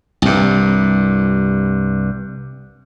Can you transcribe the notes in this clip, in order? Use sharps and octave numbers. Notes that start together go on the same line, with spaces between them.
C2 G2